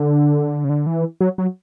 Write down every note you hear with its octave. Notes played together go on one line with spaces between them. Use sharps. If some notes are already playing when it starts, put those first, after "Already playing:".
Already playing: D3
C#3
D3
E3
F#3
F#3